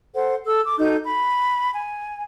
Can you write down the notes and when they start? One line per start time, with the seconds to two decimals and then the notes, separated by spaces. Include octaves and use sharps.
0.14 A4 C5 F#5
0.46 A4 E6
0.64 D6
0.79 D#4 F#4 A4 G6
1.03 B5
1.71 G#5